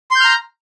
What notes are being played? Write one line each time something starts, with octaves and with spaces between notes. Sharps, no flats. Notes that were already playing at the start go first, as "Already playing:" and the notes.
A#5 C6 F6 G6